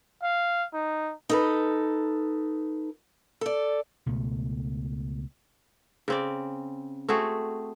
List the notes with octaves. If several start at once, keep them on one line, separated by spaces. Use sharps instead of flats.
F5
D#4
D#4 A4 B4
A4 D5
C#2 B2 A3
C#3 C4 D5
A3 C4 F#4 G#4